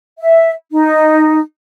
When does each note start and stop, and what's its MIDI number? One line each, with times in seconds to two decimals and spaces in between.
0.19 0.52 76
0.71 1.40 63